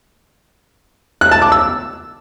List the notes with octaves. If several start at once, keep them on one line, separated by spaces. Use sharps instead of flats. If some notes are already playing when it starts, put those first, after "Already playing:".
F#6
A5
D6
E6